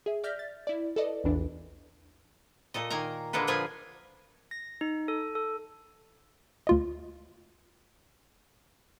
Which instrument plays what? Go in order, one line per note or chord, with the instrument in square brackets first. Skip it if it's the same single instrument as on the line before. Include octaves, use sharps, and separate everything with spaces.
[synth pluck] G#4 E5
D5 E5 F6 G6 A#6 B6
A6
E4 D5
A4 B4 D5 D#5
A#1 E2 E3 D4
[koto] A#2 A4 D#5
D#3 A#3 G#5 A#5
D3 G#3 A#3 A4 B4
A#2 F3 F4 G#4 B4 G#5
[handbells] A#6
D#4
A4
A4
[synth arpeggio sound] D2 F4 D#5